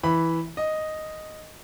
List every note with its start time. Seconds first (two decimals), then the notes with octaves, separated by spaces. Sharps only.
0.03 E3 B5
0.57 D#5